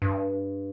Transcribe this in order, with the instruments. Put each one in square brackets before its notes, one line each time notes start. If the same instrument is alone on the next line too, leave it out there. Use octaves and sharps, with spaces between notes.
[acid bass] G2